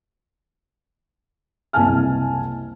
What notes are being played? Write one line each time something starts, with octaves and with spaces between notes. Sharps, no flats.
F#1 C2 E4 G#5 A5 F6